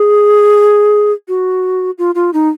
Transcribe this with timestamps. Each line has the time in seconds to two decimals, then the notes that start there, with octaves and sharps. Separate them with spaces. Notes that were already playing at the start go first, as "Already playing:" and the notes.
Already playing: G#4
1.28 F#4
1.98 F4
2.15 F4
2.33 D#4